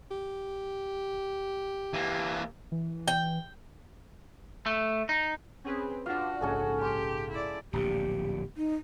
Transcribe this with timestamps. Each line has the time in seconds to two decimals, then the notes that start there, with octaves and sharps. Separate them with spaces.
0.11 G4
1.93 E3 A#3
2.72 E3
3.08 G5
4.66 A3
5.09 D#4
5.64 C4 C#4 G#4 B4
6.06 D4 F4 F#4 F5
6.41 A#1 G#2 C#3 C#4 G#4 A4
6.81 G4 C6
7.31 E4 D5
7.73 D1 A#1 A#2 G4
8.57 D#4